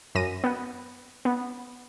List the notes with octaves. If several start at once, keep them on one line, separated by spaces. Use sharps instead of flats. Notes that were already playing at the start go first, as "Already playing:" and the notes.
F#2 A#6 D#7
B3 F#5
B3